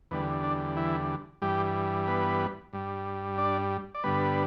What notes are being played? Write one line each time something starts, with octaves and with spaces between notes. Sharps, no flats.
E2 D3 G3 B3
D4
E3 E4
G2 E3 G3 G4
B3 B4
G2 G3
D4 D5
D5
G2 D3 G3 B3 B4